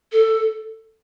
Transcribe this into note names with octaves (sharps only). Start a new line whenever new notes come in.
A4